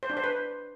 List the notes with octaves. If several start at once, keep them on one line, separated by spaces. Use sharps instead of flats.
C5
D4
C5
B4